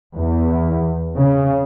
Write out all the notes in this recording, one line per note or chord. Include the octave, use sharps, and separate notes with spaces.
E2
C#3